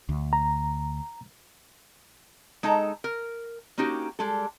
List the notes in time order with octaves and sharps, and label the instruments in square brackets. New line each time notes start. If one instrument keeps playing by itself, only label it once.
[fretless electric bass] D2
[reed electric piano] A#5
[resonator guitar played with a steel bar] G#3 D#4 A4 A5 A#5
A#4
A#3 C#4 D#4 F#4 G4
G3 G#3 A4